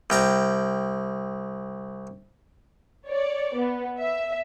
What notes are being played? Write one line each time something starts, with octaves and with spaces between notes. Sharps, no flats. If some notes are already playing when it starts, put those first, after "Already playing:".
C2 G5 A#5
C#5 D5
B3
E5